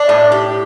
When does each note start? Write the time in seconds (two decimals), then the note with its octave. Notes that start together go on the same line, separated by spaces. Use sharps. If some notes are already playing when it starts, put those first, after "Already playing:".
Already playing: D4
0.09 A2
0.32 G4